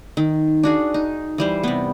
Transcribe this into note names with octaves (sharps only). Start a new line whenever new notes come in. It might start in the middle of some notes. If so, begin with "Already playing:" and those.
D#3
D4 F#4 G#4
D#4
E3 G3 C5
C3 B3